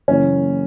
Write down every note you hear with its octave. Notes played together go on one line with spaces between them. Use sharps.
F#1 F#2 E3 A#3 C#4